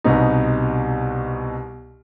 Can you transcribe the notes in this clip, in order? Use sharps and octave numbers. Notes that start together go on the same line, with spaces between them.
C2 B2 B3 D#4